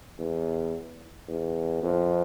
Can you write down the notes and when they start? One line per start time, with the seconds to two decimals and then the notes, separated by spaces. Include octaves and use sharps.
0.19 E2
1.29 E2
1.83 F2